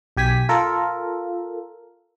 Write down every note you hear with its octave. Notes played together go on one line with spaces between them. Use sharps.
B1 G4 G#5 B6
F4 A4 A#4